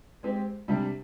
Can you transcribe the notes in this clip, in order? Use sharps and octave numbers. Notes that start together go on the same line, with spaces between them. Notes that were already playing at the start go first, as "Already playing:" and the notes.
G#3 C4 G4
C3 G3 D4